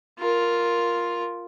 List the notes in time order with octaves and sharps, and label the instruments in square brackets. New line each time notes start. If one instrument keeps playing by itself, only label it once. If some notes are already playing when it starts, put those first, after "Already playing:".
[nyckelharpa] F4 A#4